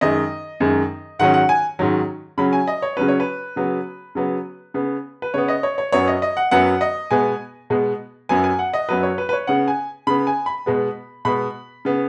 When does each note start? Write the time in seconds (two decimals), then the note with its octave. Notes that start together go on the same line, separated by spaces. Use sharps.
0.01 F#2 D#3 G#3 D#5
0.60 F#2 D#3 G#3
1.19 G#2 D#3 F#3 C#4 F#5
1.34 F#5
1.49 G#5
1.79 G#2 D#3 F#3 C#4
2.38 C#3 F#3 C#4 B5
2.53 G#5
2.67 D#5
2.82 C#5
2.97 C#3 F#3 C#4 B4
3.08 C#5
3.20 B4
3.56 C#3 F#3 B3
4.15 C#3 F#3 B3
4.74 C#3 B3
5.22 B4
5.34 C#3 B3 C#5
5.48 D#5
5.63 C#5
5.78 C#5
5.92 F#2 F#3 B3 C#5
6.08 D#5
6.22 D#5
6.37 F#5
6.51 F#2 F#3 B3 F#5
6.81 D#5
7.11 B2 G#3 B3 G#5
7.70 B2 G#3 B3
8.29 F#2 F#3 B3 G#5
8.44 G#5
8.59 F#5
8.73 D#5
8.89 F#2 F#3 B3 B4
9.03 C#5
9.18 B4
9.29 B4
9.33 C#5
9.47 C#3 B3 F#5
9.68 G#5
10.07 C#3 B3 B5
10.27 G#5
10.46 B5
10.66 B2 G#3 B3
11.25 B2 G#3 B3 B5
11.85 C#3 B3